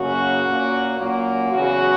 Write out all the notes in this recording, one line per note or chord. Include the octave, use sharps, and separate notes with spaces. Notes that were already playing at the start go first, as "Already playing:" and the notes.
Already playing: F#2 C#3 F#3 A#3 C#4 F#4
A#2 A#3 C#4
A#2 F#3 A#3 C#4
E2 C#3 F#3 B3 F#4